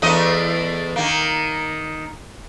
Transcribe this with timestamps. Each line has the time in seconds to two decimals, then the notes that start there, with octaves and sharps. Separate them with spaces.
0.02 E2 A3 D#5
0.96 D#3 A#3